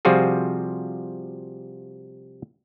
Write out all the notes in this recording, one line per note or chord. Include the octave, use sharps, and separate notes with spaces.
C3 F3 G3 F4 F#4 G#4